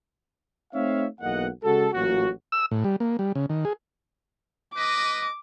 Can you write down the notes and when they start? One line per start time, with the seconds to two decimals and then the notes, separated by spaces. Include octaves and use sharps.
0.73 A3 C4 D#4 C#5 E5 F5
1.21 B1 E2 A#3 D#5 F#5
1.63 C#3 G#3 F#4 A4
1.92 A1 A#2 F#3 F#4
2.52 E6
2.71 A2
2.84 G3
3.00 A#3
3.19 G3
3.35 C#3
3.50 D#3
3.65 G#4
4.75 B4 D#5 D6